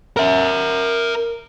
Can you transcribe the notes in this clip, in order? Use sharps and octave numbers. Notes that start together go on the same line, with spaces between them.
A#4 E5